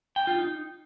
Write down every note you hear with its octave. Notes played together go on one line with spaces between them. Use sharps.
G5
F4
D#4